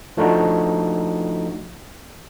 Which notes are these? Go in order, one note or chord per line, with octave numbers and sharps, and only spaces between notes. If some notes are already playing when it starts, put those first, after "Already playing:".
F3 A3 D4 D#4 F#4